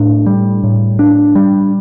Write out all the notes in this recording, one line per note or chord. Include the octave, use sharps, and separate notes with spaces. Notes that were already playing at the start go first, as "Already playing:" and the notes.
Already playing: A2 D4
G3
A2
D4
G3